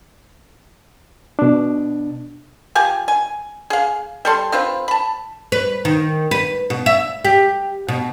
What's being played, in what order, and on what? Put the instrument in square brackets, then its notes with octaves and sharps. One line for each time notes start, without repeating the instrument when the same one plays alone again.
[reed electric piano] B2 D4
[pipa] F3 G4 G#5
G#5
G#4 F5
G3 A4 C6
C4 F4 B4 C5
A5 B5
[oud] B4
D#3
B4
B2
E5
G4
B2